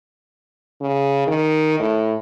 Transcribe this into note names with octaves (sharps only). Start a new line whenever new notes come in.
C#3
D#3
A2